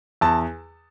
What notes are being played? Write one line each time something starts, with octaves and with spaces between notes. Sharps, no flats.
E2 A5